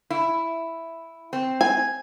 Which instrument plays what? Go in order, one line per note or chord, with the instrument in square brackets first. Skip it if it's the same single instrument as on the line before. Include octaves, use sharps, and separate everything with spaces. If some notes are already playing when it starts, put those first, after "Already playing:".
[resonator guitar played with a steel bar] E4
C4
[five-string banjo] G#5